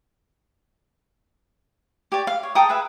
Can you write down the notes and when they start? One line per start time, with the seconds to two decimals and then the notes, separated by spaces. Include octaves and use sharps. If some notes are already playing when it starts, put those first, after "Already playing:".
2.12 G4 C#5 D5
2.27 F5
2.43 C#5
2.55 A4 G5 A#5 D#6
2.69 G#4 B4 E5